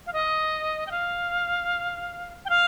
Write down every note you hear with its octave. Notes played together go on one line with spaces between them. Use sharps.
F5
D#5
G5
F5
G5
F5